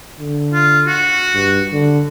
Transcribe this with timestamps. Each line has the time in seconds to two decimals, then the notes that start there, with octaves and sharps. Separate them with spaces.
0.19 D3
0.54 F4
0.87 F#4
1.35 G2
1.73 D3